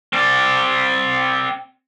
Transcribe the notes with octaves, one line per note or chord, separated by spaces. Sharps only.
C4 D5